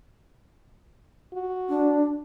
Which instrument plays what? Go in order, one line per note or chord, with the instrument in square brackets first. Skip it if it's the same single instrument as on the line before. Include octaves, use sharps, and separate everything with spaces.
[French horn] F#4
[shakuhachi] D4